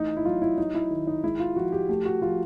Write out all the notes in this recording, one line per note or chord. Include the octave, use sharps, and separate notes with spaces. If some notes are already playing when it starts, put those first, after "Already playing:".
Already playing: E3 A3 D#4
E4
F#3 F4
E4
F#3 D#4
E4
D#3
D#4
G#3 E4
F4
F3 F#4
G4
A3 G4
F#4
F3 F4